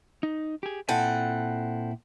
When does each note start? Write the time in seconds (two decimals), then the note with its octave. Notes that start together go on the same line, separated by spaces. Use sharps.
0.23 D#4
0.63 G4 G#4
0.89 A#2 C4 E4 A4 F#5 G#5